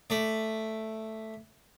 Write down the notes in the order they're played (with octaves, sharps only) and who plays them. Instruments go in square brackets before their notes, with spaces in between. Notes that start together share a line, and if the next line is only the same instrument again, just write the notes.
[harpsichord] A3 D5